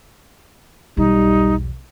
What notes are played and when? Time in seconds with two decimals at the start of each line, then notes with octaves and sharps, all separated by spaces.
0.97 B1 E2 G3 D#4